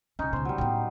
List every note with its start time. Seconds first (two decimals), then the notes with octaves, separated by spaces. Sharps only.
0.19 C2 F2 C#4 D#4
0.33 C#2 B2 C5
0.45 F#3 G3
0.58 A2 B3